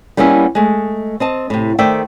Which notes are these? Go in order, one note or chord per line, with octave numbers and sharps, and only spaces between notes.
G3 A#3 B3 C#4 E4
G#3 A3
C4 D#5 A5
A2 C3
D#3 A3 C5 D5 E5 G5